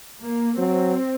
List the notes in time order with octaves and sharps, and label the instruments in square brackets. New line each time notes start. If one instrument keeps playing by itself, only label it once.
[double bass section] A#3
[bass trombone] F#3 [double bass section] C4